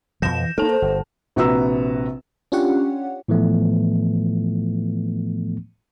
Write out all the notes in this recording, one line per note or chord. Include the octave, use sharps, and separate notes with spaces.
F2 B2 F3 G6 A#6 E7
E3
A3 A#3 D#4 A4 A5
C5
G1
A#1 C3 F#4 B4 A#5 E6
C#4 D4 F4 G4 C#5 F#5
A2 E3 F3 A3 B3